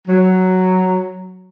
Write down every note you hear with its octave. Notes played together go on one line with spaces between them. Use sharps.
F#3